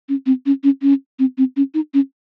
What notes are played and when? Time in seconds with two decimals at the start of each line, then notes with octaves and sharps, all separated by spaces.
0.09 C#4
0.26 C4
0.46 C#4
0.63 C#4
0.82 C#4
1.19 C4
1.38 C4
1.56 C#4
1.74 D#4
1.94 C#4